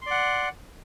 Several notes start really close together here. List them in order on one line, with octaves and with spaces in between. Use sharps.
C6 D5 F#5